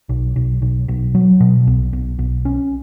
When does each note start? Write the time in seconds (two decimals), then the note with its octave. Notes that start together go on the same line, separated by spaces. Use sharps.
0.09 B1
0.36 B1
0.62 B1
0.88 B1
1.15 F#3
1.40 B2
1.67 B1
1.93 B1
2.19 B1
2.45 C#4